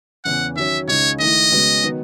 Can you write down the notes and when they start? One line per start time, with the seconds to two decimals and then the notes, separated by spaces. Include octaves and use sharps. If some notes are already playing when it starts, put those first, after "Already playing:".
0.25 E2 C#3 E3 F#5
0.56 D#3 F#3 C#4 E5
0.88 C#2 C#3 G#3 D#4 C#5
1.20 D#3 A3 E4 D#5
1.51 C#3 G#3 B3 F#4
1.83 D#3 F#3 B3 D#4